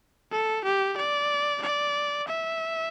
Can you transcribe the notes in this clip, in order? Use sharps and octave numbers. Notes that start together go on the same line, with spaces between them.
A4
G4
D5
D5
E5